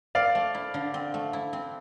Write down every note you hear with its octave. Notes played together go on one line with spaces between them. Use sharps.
C4 D5 F5
A3
E4
D3
C4
A3
E4
C4